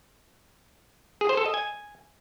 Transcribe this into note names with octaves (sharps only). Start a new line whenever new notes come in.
G#4
C5
A4
D#5
G#5